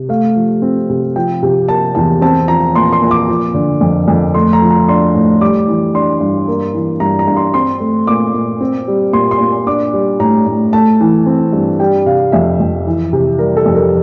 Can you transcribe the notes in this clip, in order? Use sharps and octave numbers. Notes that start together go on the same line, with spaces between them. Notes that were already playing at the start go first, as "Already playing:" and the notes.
Already playing: C3
A3 F5
F3
C4
C3
F3 G5
C3
A#3 A5
E2 A5
C4 A5
F3 A#5
A#2 C6
C6
A#2
D6
F3
D3
F2
F2
A3 C6
A#5
F3
A#5
D4 C6
A2
G3 D6
E3
D4 C6
G2
A#3
E3
G2 A#5
A#5
G2
C6
C4 C6
A3
A#2 D6
A#2
C4
G3
A#2 C6
C6
A#2
D4 D6
G3
A2 A#5
A2
A3 A5
E3
C4
G2
G3 G5
C3 F5
F2 E5
F2
E3
C3
G3 A#4
A4
F2
A#4